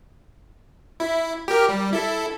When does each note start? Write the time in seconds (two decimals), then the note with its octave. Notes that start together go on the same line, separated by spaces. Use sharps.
1.00 E4
1.48 G4 A#4
1.69 G3
1.93 E4 A4